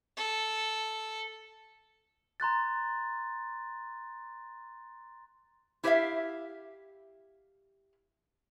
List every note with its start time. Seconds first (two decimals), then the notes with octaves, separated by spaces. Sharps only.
0.17 A4
2.40 A#5 C6 F#6 A6
5.84 E4 G4 C5 D5 E5 F5